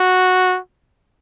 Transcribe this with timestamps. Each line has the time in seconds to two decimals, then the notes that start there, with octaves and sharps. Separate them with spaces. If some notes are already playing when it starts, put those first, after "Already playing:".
Already playing: F#4